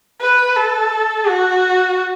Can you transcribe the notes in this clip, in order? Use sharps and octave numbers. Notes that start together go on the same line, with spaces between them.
B4
A4
F#4